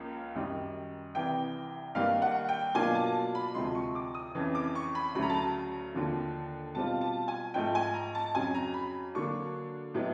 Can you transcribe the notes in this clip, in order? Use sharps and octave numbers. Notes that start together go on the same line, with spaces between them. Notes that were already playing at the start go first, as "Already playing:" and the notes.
Already playing: C#2 C#3 F3 A#3
F#2 D#3 G3
C2 C3 E3 G5
G2 D#3 G3 A#3 F5
F#5
G5
B2 F#3 A#3 D4 F4 G#5
A5
A5
B5
D2 C3 F3 G#3 C6
C#6
D6
D#6
F2 C#3 E3
D6
C#6
B5
D2 C#3 F#3 A3 B5
A#5
A5
A#5
D#2 D3 F3
B2 G3 C4 F4 A5
A5
G#5
G#2 F3 A3 G5
G#5
A#5
A5
F2 C#3 F#3 G#5
A#5
B5
D3 F#3 A#3 D4 C#6
A2 F#3 B3 D#4